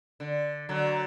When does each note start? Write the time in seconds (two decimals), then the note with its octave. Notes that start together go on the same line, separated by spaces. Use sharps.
0.20 D3
0.69 D3 F#3